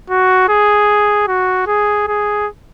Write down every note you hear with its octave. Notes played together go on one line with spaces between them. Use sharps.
F#4
G#4
F#4
G#4
G#4